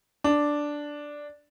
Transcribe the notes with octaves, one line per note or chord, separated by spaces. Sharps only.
D4